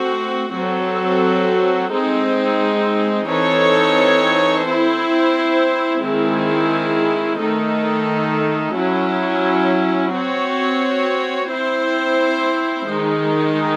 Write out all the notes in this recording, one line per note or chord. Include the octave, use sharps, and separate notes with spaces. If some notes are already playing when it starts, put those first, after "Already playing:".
Already playing: A3 C4 F#4
F#3 C4 F#4 A4
G#3 C4 D#4
E3 C4 D#4 A4 C#5
C4 E4 C5
D#3 G#3 C4 E4 G#4
D#3 A3 D#4 A4
F#3 C#4 E4
C4 F#4 C#5
C4 E4 C5
D#3 G#3 D#4